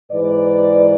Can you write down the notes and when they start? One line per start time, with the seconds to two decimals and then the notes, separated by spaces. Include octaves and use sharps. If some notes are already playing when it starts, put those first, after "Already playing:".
0.11 G#2 E3 B4 D5